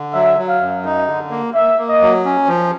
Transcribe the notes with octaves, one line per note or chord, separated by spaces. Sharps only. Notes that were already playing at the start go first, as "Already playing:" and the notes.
Already playing: D3
F#3 E5
F#3
F5
F#2
D#4
D3
A#3
A#3 E5
A#3
D#5
F#3
C#4
F3